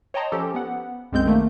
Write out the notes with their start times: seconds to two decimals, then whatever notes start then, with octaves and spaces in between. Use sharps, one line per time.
0.14 C#5 D#5 G5 A5 A#5 C6
0.32 F3 C#4 G4 A4
0.54 B3 F#5
1.12 B1 F#2 G#3 C4 G6
1.25 D#3 A3 A#3